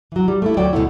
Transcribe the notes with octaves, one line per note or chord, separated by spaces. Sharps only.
E3 F#3
G3
A3 A#3 E4
D2 F#3 F4 D5 G5
D2 B2 F#3 A3 E4